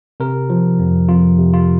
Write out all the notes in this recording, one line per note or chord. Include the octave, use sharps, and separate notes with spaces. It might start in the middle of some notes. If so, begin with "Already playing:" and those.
C3 A#4
F3
F2
F2 F4
C3
F4